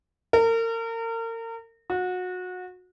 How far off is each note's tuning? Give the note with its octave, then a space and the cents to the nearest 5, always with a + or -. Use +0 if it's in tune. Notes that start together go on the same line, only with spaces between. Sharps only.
A#4 -35
F#4 -25